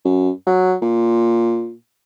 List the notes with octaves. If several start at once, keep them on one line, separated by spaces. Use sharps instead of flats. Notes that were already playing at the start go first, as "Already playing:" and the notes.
F#2
F#3
A#2